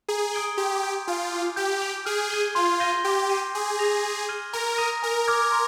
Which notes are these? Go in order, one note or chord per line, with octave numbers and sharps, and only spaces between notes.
G#4 A#5
D#6 G#6 D7 G7
G4 C6
D#6 G6 D7
F4 G#5
D6 F6
G4 G6
D7 F7
G#4 F6
G#6 D#7 G7
F4 C6
G6 A#6 D#7 G7
G4 D6
G6 C7 D#7
G#4 G6
A#6 F7
C6
F6 G#6 D#7 G7
A#4 A#5
D#6 A#6 D#7
A#4 G#5
D6 F6 G#6
C6